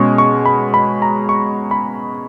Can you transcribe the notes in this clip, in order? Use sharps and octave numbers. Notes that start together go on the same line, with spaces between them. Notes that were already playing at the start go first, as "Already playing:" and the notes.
Already playing: B2 G#3 C#4 C#6
C#6
B5
B5
A#5
C#6
B5